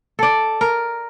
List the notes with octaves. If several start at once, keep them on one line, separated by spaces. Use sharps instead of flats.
A4 D5
A#4